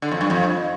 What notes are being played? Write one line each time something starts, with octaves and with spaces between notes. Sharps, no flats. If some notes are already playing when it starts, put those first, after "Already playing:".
D3
F2
G2
F2